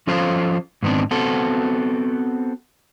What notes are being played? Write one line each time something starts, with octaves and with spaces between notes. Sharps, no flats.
F3 C#4 F4 A4 C5 F5
G#2 D#3 B3 C4 D4
B3 C4 F#4 A4